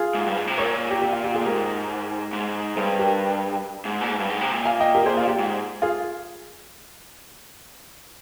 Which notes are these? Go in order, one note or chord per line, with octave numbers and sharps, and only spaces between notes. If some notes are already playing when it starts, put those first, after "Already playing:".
Already playing: F4 G#4
G#2
G2
G#2
C3
A#2 A#4 C#5
G4
G4
F4
G4
F4 G#4
A#2
G#2 G4 A#4
G#2
G2 G#4 C5
G4 A#4
G#2
A#2
G#2
G2
G#2
C3
A#2
F5 G#5
D#5 G5
G4 A#4
G#4 C5
F4
G4
G#2
F4 G#4